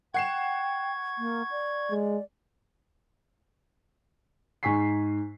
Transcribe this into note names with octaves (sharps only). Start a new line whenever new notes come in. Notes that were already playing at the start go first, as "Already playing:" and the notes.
F#5 G5 C#6 G#6 C7 E7
A#3
D5
G#3
G#2 G#5 C#6 B6 C7